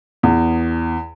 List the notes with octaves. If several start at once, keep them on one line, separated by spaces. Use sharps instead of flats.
E2